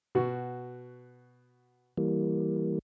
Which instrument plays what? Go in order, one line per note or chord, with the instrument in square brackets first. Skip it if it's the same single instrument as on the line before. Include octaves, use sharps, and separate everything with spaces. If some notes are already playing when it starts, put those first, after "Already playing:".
[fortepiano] B2 F#4
[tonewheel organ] E3 G3 A#3